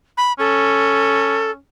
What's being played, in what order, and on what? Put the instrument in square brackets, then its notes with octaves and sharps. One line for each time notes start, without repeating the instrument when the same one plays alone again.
[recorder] B5
[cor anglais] C#4 [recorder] A4